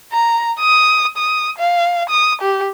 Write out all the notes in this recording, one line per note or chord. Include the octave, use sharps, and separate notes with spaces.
A#5
D#6
D#6
F5
D#6
G4